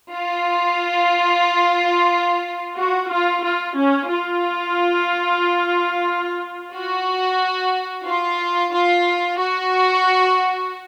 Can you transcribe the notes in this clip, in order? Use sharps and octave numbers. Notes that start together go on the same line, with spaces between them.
F4
F#4
F4
F4
C#4
F4
F#4
F4
F4
F#4